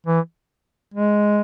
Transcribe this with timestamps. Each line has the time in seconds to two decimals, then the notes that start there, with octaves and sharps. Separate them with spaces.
0.07 E3
0.94 G#3